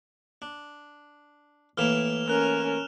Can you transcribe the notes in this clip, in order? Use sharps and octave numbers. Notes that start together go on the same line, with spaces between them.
D4
A2 E3 A#3 F6 E7 F7
C#4 A#4 F6 F#6 F7